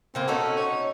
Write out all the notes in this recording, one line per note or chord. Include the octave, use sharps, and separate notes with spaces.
C#3 A#3 C4
C#4 D#4 F#4 A4
C#5